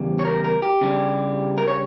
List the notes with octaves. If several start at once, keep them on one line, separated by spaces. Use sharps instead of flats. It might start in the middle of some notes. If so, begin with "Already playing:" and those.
Already playing: E2 C#3 G3
C#5
A#4
A#4
G4
C#3 G3 D4
A#4
C#5